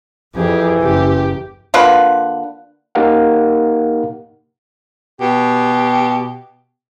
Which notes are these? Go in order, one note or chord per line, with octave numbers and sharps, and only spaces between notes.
F2 E3 G4 G#4
F#1 G4
D3 A#3 F4 B4
A#3 D#4 G4 A#4 F5 F#5
B2 G4